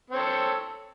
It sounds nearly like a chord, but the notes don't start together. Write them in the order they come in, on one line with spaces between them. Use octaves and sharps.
C4 C#5 A4